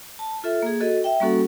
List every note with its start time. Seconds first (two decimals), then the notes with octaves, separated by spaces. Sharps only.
0.19 A5
0.44 F4 A4 E5
0.62 A#3 G#4
0.81 F#4 A4 D#5
1.04 E5 G5
1.20 G3 A#3 C#4 F#4 A4 F#5